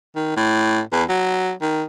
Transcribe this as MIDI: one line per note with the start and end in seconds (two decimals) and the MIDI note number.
0.16 0.34 51
0.37 0.80 45
0.92 1.03 40
1.09 1.51 54
1.62 1.83 51